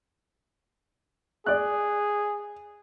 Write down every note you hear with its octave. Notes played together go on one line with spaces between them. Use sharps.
G#4 D5 F#6